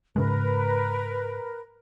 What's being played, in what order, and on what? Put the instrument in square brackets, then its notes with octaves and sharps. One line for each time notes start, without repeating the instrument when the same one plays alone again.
[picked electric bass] G#2 C#3 G#3 [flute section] A#4 B4